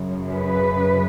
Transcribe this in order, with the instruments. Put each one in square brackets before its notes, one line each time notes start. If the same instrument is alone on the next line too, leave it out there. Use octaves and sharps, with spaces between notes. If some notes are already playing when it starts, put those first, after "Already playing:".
Already playing: [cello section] F#2 C#3
B4